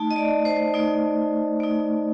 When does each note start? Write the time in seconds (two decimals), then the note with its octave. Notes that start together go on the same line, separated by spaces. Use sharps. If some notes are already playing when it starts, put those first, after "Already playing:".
Already playing: A3 D#4 A5
0.11 D#5
0.16 D5
0.45 C5
0.74 A3 D#4
1.60 A3 D#4